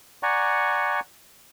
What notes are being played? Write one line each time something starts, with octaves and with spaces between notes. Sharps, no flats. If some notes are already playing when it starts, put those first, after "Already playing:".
D5 F#5 G#5 A#5 C#6